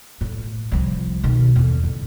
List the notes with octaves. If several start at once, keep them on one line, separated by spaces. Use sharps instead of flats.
A2
C2 F3
B2 D#3
E2 D3
A2